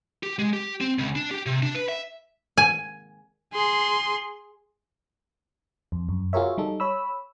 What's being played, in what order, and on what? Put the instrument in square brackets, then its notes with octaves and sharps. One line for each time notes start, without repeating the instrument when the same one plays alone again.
[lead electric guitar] G4
G#3
G4
C4
C#2
D4
G4
C3
D4
B4
E5
[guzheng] G#5
[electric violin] G#4 C6
[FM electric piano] F2
F#2
F4 F#4 G#4 A#4 C#5 E5
G3 D#4 A4
C#5 B5 E6